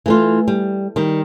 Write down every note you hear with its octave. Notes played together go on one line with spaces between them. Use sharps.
E3 A3 F4
G3
D#3 G3